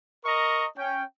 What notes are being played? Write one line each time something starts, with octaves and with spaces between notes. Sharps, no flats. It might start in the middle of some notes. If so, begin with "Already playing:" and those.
A#4 D#5 A#5 C#6
C#4 G5